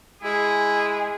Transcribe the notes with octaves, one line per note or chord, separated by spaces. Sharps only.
G#3 E4 G#4